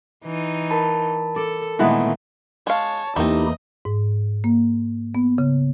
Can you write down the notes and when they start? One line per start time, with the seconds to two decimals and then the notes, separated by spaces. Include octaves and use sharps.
0.25 E3 D#4
0.70 A#4 A5 B5
1.36 A4 D5
1.79 A#2 D#3 E3 G#3 A3 B3
2.67 G#3 C#5 F5 A5
3.16 E2 A3 A#3 C4 D#4 E4 G4 D#5
3.85 G#2
4.44 A#3
5.15 B3
5.38 C#3